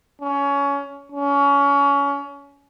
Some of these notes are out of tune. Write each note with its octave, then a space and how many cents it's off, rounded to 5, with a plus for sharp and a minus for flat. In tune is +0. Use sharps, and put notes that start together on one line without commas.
C#4 +20
C#4 +25